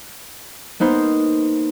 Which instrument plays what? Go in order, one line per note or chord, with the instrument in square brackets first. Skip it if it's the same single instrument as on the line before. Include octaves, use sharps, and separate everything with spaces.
[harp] A#3 B3 D#4 C5